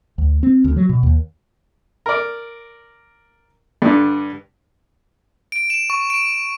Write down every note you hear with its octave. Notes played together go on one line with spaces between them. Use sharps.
D2
C4
D2
F#3
B2
D#2
A#4 D5
G2 D3
D7
E7
C#6
D7